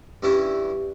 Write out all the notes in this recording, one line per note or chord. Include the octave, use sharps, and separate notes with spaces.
G2 E3 G3 C#4 E4